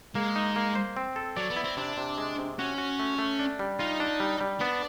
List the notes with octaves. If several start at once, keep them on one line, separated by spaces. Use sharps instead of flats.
G#3 A#3
D#4
A#3
C5
C4
A4
F#3 D5
B3
E4
C4
C3 D4
C3
G#3
C3
C#4 F#4
F#4
A3
A3
D4
G3
D#4 F4
D4
G3
G3
B3 D4